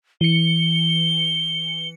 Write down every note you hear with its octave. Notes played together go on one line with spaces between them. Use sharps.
E3 C#7 G7